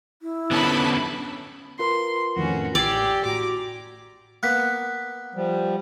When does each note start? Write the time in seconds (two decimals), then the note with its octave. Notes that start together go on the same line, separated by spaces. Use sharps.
0.22 E4
0.51 D3 B3 C#4 A5 B5
1.79 F4 A#4 B4 C6
2.36 F2 A2 D#3 C#4 F#4
2.75 A1 G4 D5 E6 G#6 C7
3.25 A2 F#4 A#5 D6
4.43 A#3 B3 F#6 B6
5.35 F3 G3